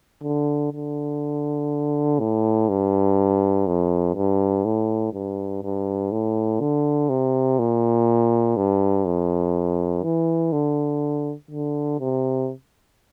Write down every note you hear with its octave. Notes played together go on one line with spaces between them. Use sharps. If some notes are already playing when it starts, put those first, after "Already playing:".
D3
D3
A2
G2
F2
G2
A2
G2
G2
A2
D3
C3
A#2
G2
F2
E3
D3
D3
C3